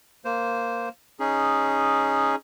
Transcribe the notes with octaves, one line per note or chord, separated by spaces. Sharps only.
A#3 C5
C#4 D#4 G#4